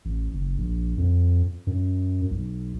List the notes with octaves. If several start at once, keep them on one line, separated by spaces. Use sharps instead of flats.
A1
F#1
A#1
F2
F#2
B1